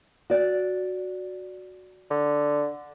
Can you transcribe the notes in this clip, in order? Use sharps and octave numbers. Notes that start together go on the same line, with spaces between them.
F#4 D5
D3